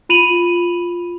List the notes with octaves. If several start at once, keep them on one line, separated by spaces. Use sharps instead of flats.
F4 B5 D#7 F7 F#7